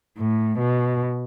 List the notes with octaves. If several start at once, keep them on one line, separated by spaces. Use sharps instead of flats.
A2
B2